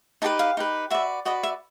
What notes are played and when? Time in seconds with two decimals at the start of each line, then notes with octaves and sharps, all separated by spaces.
0.22 D#4 G4 B4 A5
0.39 F5
0.57 D#4 G4 B4
0.90 F#4 B4 D5 E5
1.25 F#4 B4 D5 D#5
1.43 E5